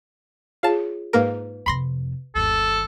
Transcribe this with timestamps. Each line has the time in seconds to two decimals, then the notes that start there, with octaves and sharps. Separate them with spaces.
0.63 F4 G#4 C#5 F5 A5
1.13 G#2 A#3 A#4 B4 F5
1.66 F2 C3 B5 C6 A#6
2.35 G1 D#2 A4